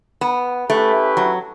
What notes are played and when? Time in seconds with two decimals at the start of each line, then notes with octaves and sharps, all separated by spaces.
0.21 B3
0.69 A3 C#4 E4 G4 B4
1.17 F#3